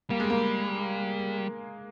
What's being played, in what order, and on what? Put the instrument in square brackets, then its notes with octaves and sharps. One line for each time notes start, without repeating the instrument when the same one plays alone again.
[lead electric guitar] G3 [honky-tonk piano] A#3
[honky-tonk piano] G#3
A#3